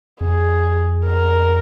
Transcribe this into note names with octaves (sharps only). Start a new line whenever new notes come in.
F2 G#4
A#4